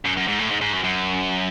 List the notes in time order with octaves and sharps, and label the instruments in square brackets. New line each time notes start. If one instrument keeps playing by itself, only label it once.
[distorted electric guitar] F#2
F#2
G#2
A2
G#2
G#2
F#2
F#2